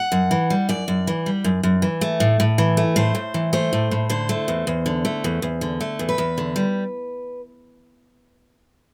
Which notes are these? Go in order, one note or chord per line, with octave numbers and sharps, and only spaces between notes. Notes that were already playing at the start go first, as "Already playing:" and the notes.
Already playing: F#5
F#2
E3
G3
F#2 D5
F#2
E3
G3
F#2
F#2
E3
A3
A2
A2
E3
A3
A2 C5
A2
E3
A3 C5
A2
A2
D3 C5
A3
E2
E2
D3
A3
E2
E2
D3
A3
E2
B4
E2
D3
G3